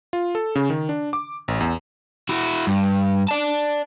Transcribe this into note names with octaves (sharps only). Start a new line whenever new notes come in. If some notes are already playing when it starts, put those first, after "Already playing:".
F4
A4
C#3
D#3
D4
D6
A1
E2
E4 F#4
G2
D5 A5